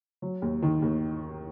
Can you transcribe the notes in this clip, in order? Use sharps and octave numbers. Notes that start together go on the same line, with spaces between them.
F#3
D#2
D#3
D#2